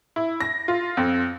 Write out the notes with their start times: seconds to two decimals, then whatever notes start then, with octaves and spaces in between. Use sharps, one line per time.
0.16 E4
0.41 A#6
0.68 F4
0.97 F2